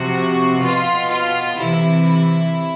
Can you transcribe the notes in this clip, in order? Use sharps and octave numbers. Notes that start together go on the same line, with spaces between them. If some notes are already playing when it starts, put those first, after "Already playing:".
Already playing: C3 F3 F#4
B2 F4
F4
C3 E3 E4
E4